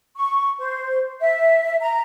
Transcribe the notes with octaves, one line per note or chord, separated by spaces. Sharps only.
C#6
C5
E5
A#5